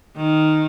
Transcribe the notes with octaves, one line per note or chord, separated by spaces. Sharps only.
D#3